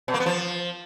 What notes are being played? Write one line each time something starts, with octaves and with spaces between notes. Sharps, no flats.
B2
A#3
B3
F3